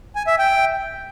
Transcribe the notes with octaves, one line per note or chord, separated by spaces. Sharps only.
G#5
E5
G5